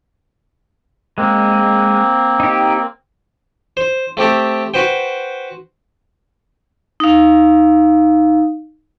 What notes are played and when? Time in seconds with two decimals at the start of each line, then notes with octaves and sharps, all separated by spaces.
1.18 G#3 A#3 C4
2.40 D#4 G4
3.77 C5
4.17 A3 C4 G4 A4
4.74 F#4 B4 C5 G5
7.00 D#4 F5